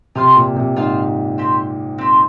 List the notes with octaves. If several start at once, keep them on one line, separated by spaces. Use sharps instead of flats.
C3 F4 C5 F5
A#2
C3
G#2 F4 C5 F5
C4 G4 C5
C4 G4 C5